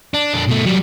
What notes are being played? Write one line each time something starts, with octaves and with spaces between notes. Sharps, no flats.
D4
F2 D4
B2 A3
F#3 G3